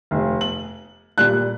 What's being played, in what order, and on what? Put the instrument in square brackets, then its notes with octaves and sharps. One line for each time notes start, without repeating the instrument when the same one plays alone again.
[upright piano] F1
F#7
A#2 G3 F#6